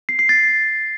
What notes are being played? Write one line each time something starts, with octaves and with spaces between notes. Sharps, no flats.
C7
C7
A6